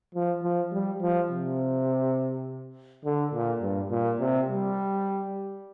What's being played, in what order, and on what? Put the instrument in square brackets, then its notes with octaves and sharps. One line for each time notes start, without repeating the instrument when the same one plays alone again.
[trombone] F3
F3
G3
F3
C3
D3
A#2
G2
A#2
C3
G3